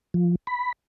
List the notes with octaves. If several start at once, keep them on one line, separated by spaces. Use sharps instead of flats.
F3
B5